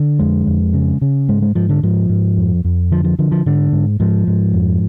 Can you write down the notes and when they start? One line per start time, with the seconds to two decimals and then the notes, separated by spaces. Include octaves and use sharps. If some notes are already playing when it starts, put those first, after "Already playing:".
Already playing: D3
0.19 F2 G#3
0.47 F2
0.74 C#3
1.01 C#3
1.29 G#2 G#3
1.42 G#3
1.55 G#2 F3
1.69 D3
1.83 G#2 F3
2.09 G#2
2.37 F2
2.64 F2
2.91 D3 F3
3.04 F3
3.19 D3 F3
3.31 F3
3.46 G#2 D3
3.72 G#2
4.00 G#2 F3
4.27 G#2
4.54 F2